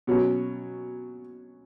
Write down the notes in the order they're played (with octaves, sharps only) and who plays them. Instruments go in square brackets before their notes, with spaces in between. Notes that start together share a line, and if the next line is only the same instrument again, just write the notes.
[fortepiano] B2 F#3 C#4